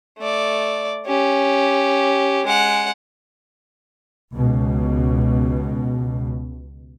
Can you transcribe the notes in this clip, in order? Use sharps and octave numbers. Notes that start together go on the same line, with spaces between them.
A3 D5
C#4 G4
G#3 F#5
C#2 B2